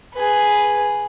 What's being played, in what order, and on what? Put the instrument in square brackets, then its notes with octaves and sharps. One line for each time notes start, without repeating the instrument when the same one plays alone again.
[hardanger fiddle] G#4 B4